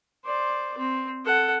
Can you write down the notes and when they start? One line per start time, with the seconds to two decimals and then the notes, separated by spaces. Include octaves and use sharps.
0.25 C5 D5
0.77 C4
1.25 A4 F#5